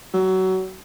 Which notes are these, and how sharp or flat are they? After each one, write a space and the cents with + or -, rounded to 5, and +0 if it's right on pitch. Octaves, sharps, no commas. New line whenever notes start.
F#3 +25